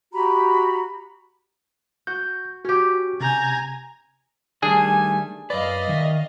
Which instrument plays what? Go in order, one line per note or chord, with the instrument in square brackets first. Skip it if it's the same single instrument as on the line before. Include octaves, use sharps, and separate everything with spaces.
[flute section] F#4 G4 A#5 B5
[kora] F#4 [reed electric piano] G6
[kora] C#4 G4 [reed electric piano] F#4
[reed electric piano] C3 G6 [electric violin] G#5 A#5
[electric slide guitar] D#3 G3 A3 [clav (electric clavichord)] D4 G#4 [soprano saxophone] G#5
[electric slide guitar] F#2 B4 [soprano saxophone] D5 [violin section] D#5 F5
[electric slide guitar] D#3 E5